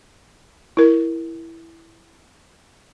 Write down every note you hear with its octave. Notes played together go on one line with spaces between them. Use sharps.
E4 A#4